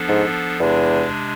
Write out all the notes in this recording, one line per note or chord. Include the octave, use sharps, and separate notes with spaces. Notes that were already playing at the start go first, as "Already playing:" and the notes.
Already playing: F3 B3 D4 A4
G#2
E2 C3 G#3 D4